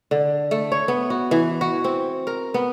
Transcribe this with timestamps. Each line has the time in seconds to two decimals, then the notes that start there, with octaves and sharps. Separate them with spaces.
0.11 D3
0.51 A3
0.72 C#5
0.88 B3
1.10 F#4
1.31 E3
1.61 F#4
1.84 C4
2.27 A#4
2.54 B3